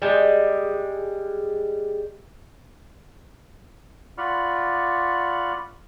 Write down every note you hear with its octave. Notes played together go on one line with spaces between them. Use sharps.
G3 G#3
F4 D5 F#5 B5 C#6 F6